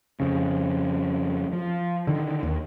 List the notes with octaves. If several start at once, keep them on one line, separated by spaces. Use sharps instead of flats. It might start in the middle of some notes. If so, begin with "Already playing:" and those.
F2 C#3
F3
D3 D#3
D#2